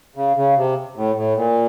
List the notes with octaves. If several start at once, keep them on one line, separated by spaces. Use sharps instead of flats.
C#3
C#3
C3
A2
A2
A#2